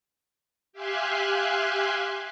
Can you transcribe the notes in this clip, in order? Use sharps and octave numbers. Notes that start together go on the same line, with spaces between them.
G4 E5 F5 G#5 C6 F#6